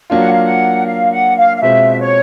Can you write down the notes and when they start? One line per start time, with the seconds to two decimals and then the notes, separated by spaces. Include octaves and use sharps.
0.10 F#3 A#3 D4 F4
0.20 F#5
0.32 F5
0.43 F#5
0.86 F5
1.11 F#5
1.36 F5
1.56 F5
1.61 B2 G#3 C4 F4 E5
2.00 C#5